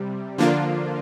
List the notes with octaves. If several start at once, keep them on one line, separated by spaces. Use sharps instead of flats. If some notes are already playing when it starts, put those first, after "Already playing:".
Already playing: C3 G3
D3 F3 A#3 D4 F4